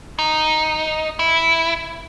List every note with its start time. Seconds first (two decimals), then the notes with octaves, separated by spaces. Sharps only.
0.19 D#4
1.19 E4